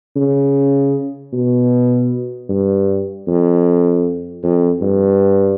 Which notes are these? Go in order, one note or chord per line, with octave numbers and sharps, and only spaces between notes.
C#3
B2
G2
F2
F2
G2